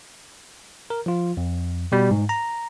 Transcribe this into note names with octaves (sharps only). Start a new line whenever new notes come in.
A#4
F3 F4
F2
B2 G3
G#2
A#5